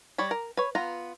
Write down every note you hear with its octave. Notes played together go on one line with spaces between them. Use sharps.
G3 C#5 B5
A#4
B4 C#5
B3 F4 A#5